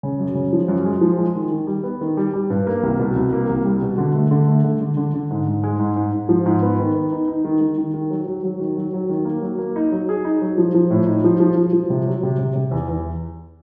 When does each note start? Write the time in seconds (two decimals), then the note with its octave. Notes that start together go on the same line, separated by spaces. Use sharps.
0.03 C#3
0.20 F#2
0.35 C#3
0.53 F3
0.68 F#2
0.85 G#3
1.01 F3
1.18 G#3
1.35 D#3
1.51 D#3
1.67 G3
1.84 B3
2.01 D#3
2.17 G3
2.33 G3
2.50 G2
2.67 A#3
2.83 C2
2.99 B2
3.16 C2
3.33 A#3
3.49 C2
3.65 G3
3.82 B2
3.98 D3
4.15 A3
4.31 D3
4.48 A3
4.64 D3
4.81 D3
4.97 D3
5.14 D3
5.30 G#2
5.47 G#2
5.63 G#3
5.79 G#2
5.96 G#2
6.13 G#2
6.29 F3
6.46 G#2
6.62 B3
6.79 D#3
6.95 B3
7.12 D#4
7.28 D#4
7.45 D#3
7.61 D#3
7.78 D#3
7.94 D#3
8.11 F#3
8.27 F#3
8.43 F#3
8.60 D#3
8.77 F#3
8.93 F#3
9.09 D#3
9.25 A#3
9.42 F#3
9.59 A#3
9.76 D#4
9.92 F#3
10.09 G#4
10.25 D#4
10.42 F#3
10.58 F3
10.74 F3
10.90 A2
11.07 D#4
11.24 F3
11.40 F3
11.56 F3
11.73 F3
11.90 C3
12.07 F#3
12.23 C3
12.39 C3
12.55 C3
12.71 E2
12.88 E2